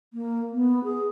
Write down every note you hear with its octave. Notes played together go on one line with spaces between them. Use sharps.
A#3
B3
G#4